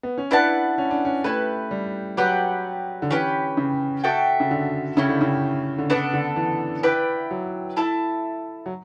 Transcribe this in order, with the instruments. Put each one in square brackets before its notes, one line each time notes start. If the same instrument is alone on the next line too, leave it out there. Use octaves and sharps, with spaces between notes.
[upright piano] B3
C#4
[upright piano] D4 [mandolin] E4 B4 F#5 A5
[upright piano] C#4
D4
C#4
[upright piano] A3 [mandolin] E4 G4 B4
[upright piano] G3
[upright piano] F#3 [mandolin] G4 B4 D5 F#5
[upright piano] D3
[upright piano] E3 [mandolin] C#4 G4 B4
[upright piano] C#3
[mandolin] F#4 A4 E5 G5
[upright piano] C#3
D3
[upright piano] C#3 [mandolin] A3 C#4 E4 G4
[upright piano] D3
C#3
D3
[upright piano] C#3 [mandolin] B3 D4 A4 D5
[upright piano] D3
E3
[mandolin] E4 B4 D5 G5
[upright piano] F#3
[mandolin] E4 A4 E5 A5
[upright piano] F#3